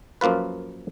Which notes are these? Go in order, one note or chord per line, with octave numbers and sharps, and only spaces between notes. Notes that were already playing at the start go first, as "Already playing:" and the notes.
F#2 F3 A#3 F4 B4